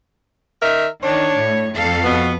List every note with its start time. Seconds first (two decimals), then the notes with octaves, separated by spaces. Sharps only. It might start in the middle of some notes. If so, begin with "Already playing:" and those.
0.62 D#3 A#4 E5
1.03 D#3 D4 C#5
1.37 A2
1.74 F2 A4 F5
2.04 B2 B3